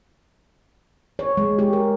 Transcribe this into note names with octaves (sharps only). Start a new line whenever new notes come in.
C#5
G#3
G4
A#4